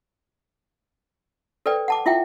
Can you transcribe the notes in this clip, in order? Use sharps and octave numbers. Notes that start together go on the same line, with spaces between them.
A4 B4 C5 D5 G5
F#5 A5 D6
E4 F4 E5 F#5 G5